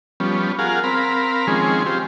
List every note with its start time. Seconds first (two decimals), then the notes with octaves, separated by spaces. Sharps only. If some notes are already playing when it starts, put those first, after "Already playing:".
0.20 F3 G3 B3 C#4
0.59 F4 G#4 A#4 F5 F#5
0.84 C4 A#4 F5 B5
1.47 D#3 F3 G#3 C4 C#4 G#4
1.86 F4 G4 C5